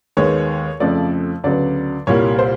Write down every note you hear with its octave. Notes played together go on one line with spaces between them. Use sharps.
D#2 D#3 G#3 B3 C#5
F2 C#3 F3 A3 D5
D2 C#3 F#3 B3 D5
C2 A#2 G3 A#3 C#5
C5